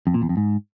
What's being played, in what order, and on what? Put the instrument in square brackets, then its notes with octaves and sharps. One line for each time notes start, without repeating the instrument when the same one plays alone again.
[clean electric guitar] F2
A#2
E2
F2
G#2